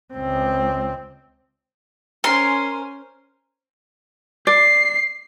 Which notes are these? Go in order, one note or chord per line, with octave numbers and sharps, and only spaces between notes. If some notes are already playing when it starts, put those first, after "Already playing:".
C#2 C4
C#4 A#4 C5 G#5 C6
D5 C7